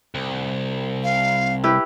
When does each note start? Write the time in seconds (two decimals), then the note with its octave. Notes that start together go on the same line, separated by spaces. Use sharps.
0.14 C2
1.04 F5
1.64 E4 G4 B4